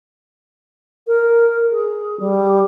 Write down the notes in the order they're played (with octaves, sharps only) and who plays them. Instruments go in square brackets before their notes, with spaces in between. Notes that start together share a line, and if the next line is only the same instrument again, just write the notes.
[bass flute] A#4
G#4
G3